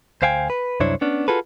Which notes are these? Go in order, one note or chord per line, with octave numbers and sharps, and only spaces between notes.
D2 C5 F5 G5 G#5
B4
C2 F#2 D4 E4 C5 C#5
B3 C#4 D4
F4 F#4 G#4 A4 B4